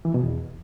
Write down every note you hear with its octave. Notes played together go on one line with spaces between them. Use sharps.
E3
B2
E2